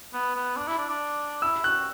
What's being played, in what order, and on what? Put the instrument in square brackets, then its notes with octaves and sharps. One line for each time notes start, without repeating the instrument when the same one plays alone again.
[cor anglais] B3
B3
D4
E4
D4
D4
[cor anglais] E4 [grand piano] E6
[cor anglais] F#4 [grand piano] F#6